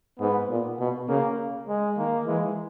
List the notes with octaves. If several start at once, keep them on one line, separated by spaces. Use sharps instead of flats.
G#2 B3
A#2
B2
C#3 A#3
G#3
D#3 A#3
E3 G#3